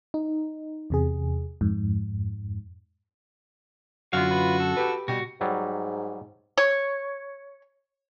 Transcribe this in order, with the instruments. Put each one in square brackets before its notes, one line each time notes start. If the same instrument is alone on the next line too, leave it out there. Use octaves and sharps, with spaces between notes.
[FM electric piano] D#4
E2 C3 G#4
F2 G#2
[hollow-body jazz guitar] F#2 D3 [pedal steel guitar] F4 F5 [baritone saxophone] F#4
[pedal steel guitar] F4 B4
A4
[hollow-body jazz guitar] G4 B4
[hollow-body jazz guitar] B2 [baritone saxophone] G3 [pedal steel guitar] F#4
[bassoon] G#2 [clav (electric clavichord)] F#3 G3
[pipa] C#5